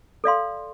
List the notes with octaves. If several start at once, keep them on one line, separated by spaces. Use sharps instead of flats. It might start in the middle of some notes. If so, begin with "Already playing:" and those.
A4 D5 F5 C6